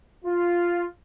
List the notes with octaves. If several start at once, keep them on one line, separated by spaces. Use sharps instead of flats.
F4